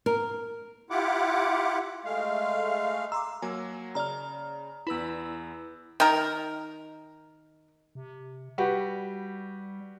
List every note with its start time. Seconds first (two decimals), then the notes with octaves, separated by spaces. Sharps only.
0.06 A#4
0.90 E4 F4 G4 F#5 D6
2.05 G#3 A3 F5
3.12 A#5 C6 D6 E6
3.42 F#3 A#3 G#5
3.95 C#3 D5 A#5 F6
4.87 E2 E4 B4 B5 E6
6.00 D#3 A#4
7.95 C3
8.58 G3 F#4 G4 B4